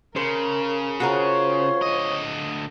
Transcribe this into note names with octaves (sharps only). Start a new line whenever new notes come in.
C#3 A#4 C5
F4 F#4 G#4 A#4 C5 C#5
D2 D#5